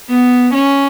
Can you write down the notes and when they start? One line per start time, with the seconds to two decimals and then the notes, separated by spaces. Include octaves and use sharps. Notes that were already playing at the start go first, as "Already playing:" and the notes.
0.10 B3
0.54 C#4